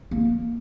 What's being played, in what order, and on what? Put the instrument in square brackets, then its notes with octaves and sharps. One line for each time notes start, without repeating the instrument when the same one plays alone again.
[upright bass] A#3